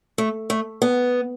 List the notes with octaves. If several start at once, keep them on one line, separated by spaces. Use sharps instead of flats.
A3
A3
B3